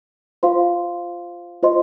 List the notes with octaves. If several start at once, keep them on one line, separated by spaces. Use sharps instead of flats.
F4 C5 F5 C6
F4 C5 D#5 C6